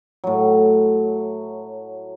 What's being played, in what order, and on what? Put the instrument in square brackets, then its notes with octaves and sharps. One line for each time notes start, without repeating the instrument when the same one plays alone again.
[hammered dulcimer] A2 F#3